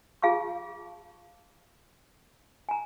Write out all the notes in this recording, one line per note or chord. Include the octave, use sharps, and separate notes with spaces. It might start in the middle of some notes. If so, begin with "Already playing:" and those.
F4 G#4 F5 A5 C#6
G#5 A#5